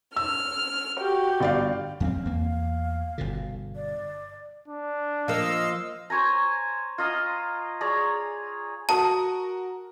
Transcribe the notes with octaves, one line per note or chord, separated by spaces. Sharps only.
E6 F6
F#4 G4
G1 D5 F5
F2 B3 C4 F5
E2 A#3
G1 B2 D3
D5
D4
F3 A#3 D#5 F5 E6
C5 C#5 G#5 A#5
F4 D#5 A#5 D#6
G#4 C#5 D5 A#5
F#4 A#4 A5 D#6